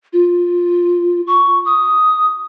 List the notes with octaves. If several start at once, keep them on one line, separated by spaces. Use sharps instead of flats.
F4
C#6
D#6